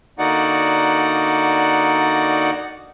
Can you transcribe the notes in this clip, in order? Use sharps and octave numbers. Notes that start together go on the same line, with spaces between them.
D3 A#3 D#4 F#4 D5 F#5